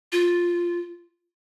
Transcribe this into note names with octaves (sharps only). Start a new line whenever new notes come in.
F4